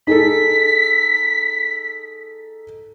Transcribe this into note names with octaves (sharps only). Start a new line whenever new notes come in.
D#4 G#4 A4 B6